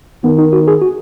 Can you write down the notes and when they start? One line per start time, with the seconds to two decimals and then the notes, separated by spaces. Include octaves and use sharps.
0.24 D#3 B3
0.39 D#4
0.53 F#4
0.68 G#4
0.82 F#4